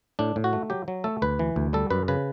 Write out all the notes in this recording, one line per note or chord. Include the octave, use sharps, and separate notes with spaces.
A2 D4
A2
F#4
A3
F#3 G4
F#3
A3 A4
D2 B4
E3
D2
G3 A4
F#2 B4
C#3 B4